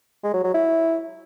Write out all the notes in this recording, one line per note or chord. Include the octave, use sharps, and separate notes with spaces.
G#3
F#3
F#3
E4